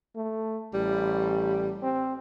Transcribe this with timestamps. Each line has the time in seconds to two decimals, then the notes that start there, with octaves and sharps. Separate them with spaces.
0.15 A3
0.74 A1 G3
1.83 C4